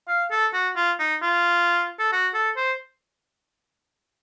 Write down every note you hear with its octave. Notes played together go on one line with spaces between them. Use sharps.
F5
A4
F#4
F4
D#4
F4
A4
F#4
A4
C5